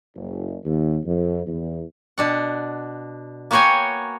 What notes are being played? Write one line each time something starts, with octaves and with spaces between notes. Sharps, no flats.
F#1
D#2
F2
E2
B2 D4 F#5
A#3 B3 F#4 C#5 G5 G#5